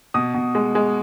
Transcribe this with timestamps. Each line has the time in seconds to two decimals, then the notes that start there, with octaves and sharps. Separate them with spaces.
0.14 B2 D#6
0.34 B2
0.55 G#3
0.75 G#3